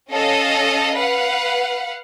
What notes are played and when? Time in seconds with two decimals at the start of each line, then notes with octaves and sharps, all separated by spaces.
0.11 C#4 A4 D#5 F5
0.95 B4 F5 F#5